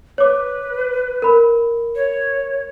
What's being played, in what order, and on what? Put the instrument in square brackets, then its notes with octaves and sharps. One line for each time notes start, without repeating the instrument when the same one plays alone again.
[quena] B4 [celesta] C#5 D6
[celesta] A#4 B5
[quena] C#5